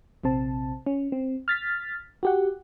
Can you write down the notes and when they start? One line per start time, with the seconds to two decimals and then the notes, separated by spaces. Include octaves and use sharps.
0.24 A#1 C3 C4 A5
0.86 C#4
1.12 C4
1.48 F6 A6 B6
2.23 F#4 G4 F#5